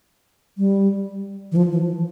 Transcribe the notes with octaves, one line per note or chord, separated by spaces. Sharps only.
G3
E3
F3
E3